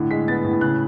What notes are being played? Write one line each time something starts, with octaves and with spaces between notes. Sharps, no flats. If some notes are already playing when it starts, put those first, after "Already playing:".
Already playing: A2 D3
G#3 B6
B3 A6
A2
C#3 F#6